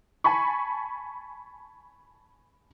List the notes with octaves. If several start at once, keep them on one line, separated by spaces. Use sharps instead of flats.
G#5 A5 B5 C#6